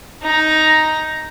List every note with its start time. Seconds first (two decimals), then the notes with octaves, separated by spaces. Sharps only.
0.23 D#4 A#5